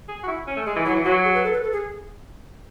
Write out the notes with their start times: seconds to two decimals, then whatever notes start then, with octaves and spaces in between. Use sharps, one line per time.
0.08 G#4
0.23 F#4
0.28 E4
0.47 C#4
0.56 A3
0.66 G#3 G#4
0.76 E3
0.85 F#3 E4
0.96 E3
1.05 F#3 F#4
1.25 G#4
1.34 B4
1.44 A4
1.53 B4
1.63 A4
1.73 G#4